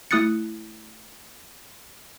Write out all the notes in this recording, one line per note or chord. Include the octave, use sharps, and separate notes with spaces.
A3 E4 D#6 F#6 A6 C#7